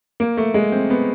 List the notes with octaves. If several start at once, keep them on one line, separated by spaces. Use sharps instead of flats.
A#3
A3
G#3
C4
B3